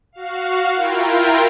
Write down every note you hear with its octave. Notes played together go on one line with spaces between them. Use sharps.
F#4 F5
E4 F4 A#4 G5